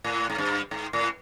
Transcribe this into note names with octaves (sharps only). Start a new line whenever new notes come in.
A2
G#2
G2
G#2
A2